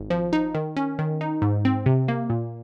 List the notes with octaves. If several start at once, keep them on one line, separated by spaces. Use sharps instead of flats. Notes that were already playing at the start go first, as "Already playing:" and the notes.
Already playing: G#1
F3
D#4
D#3
C#4
D#3
D#4
G#2
C4
C3
A#3
A#2